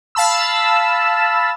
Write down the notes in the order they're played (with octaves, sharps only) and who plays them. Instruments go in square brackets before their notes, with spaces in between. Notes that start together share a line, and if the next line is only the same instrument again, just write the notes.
[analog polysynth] F5 A5 B5 E6